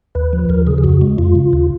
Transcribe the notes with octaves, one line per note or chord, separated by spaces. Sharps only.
D#2 B4
F3
D#2 A#4
C#3 G#4
G#4
F2 F#4
G#3
F2 F4
C#3
D#2